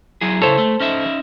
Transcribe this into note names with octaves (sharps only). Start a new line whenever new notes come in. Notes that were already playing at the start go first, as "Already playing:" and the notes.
F#3 E4 G#4
C#3 E4 A4 C5 C#5
A3
C#4 D#4 E5